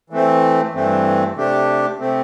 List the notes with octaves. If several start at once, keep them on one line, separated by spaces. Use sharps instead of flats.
E3 A3 C4
G2 E3 A3 C4
C3 A3 D4 G4
C3 A3 C4